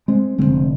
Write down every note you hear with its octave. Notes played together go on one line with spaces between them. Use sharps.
G#3 C4
F1 F2 D3 G#3 C4